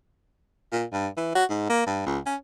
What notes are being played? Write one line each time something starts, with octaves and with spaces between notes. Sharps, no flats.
A#2
G2
E3
F#4
G#2
A#3
G2
C#2
C#4